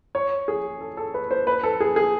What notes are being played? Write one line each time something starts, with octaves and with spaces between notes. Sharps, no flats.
C#5
G#4
A4
A4
B4
C5
B4
A4
G#4
G#4